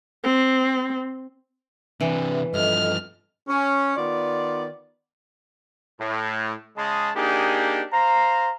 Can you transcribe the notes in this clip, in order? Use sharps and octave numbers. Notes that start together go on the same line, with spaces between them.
C4
C3 E3 D4
G2 F3 A4 D#5 F6
C#4
D#3 B3 F4 D5
A2
C#3 G#3 D#5 A5 C6
A#3 D4 D#4 G4 G#4
C5 F5 A#5